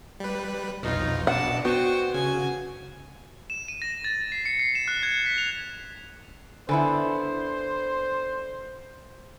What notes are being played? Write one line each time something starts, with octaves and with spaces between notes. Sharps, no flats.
G3 B4
B1 F2 B2 D#4 F4
B2 D4 F#5 A5
B3 F#4 C5 G5 C#6
C#3 G#5
E7
D#7
A#6
A6
C7
C#7
C7
E7
F#6
G#6
B6
F7
D3 B3 E4 C5 G#5 B5